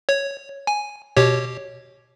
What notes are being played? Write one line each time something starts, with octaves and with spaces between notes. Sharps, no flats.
C#5
G#5
B2 G4 C#5